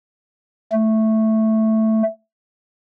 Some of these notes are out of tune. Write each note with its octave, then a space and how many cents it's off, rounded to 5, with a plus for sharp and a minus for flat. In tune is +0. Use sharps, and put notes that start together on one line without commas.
A3 +0